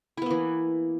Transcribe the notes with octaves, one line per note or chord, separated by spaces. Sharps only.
E3 A#3 B3 E4